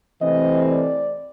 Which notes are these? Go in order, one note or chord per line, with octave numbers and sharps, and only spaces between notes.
C3 E3 A3 C4 D#5
D5